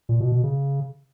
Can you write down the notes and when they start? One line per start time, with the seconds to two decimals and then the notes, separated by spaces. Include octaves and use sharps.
0.09 A#2
0.20 B2
0.32 B2
0.44 C#3